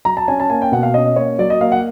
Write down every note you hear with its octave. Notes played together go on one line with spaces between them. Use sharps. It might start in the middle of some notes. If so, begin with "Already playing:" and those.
F#3 A#5
A5
C#4 G#5
A5
A#3 G#5
G5
B2 F#5
F5
C#4 D#5
A#3 C#5
F#3 D5
D#5
A#3 F5
F#5